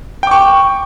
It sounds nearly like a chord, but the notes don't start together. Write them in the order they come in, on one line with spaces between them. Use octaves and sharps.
G5 D6 C#6